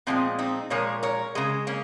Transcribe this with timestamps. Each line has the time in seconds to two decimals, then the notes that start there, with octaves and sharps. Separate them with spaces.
0.07 A#2 F3 G#3 C4
0.39 C4 D#4
0.70 A#2 F3 G#3 A#4 C#5
1.03 A#4 C#5
1.35 C#3 G#3
1.67 A#3 C#4